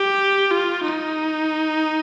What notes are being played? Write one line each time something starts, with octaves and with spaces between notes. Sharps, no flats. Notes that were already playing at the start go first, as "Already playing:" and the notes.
Already playing: G4
F4
D#4